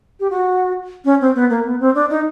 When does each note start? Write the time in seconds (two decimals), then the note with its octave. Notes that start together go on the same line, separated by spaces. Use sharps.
0.20 G4
0.30 F#4
1.05 C#4
1.21 C4
1.35 B3
1.50 A#3
1.65 B3
1.80 C4
1.95 D4
2.10 D#4